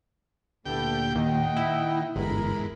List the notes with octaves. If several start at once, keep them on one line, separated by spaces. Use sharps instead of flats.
D2 A#2 B3 E4 G4 A4 G5
D#2 D#3 D#5 F#5 G5
E4
G1 E2 G#2 A#4 B5